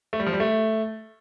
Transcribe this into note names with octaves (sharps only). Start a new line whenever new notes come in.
A3
G3
F3
G3
A3